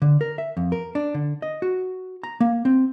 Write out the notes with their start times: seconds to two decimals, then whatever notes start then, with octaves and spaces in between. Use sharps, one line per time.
0.02 D3
0.21 A#4
0.38 E5
0.57 F2
0.72 A#4
0.95 D4
1.14 D3
1.42 D#5
1.62 F#4
2.24 A#5
2.40 A#3
2.65 C4